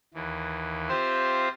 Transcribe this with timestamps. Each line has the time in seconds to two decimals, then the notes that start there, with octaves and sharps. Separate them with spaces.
0.14 D#2 E3
0.89 C4 F4 G4 C5 E5 C6